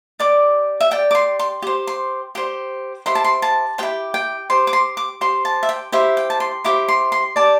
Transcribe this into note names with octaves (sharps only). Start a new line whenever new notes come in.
G4 D5 D6
E5
G4 D5 G5
D6
C6
C6
G4 C5
C6
G4 C5
E4 G4 C5 C6
A5
C6
A5
E4 G4 C5 G5
G5
G4 C5 C6
D6
C6
D6
G4 C5 C6
A5
E5
G5
E4 G4 C5 E5
G5
A5
C6
E4 G4 C5 D6
C6
C6
G4 D5 A5